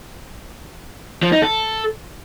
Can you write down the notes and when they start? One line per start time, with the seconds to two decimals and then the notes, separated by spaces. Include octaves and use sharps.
1.23 F3
1.32 D#4
1.42 A4